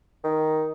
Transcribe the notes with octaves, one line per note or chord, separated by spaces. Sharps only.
D#3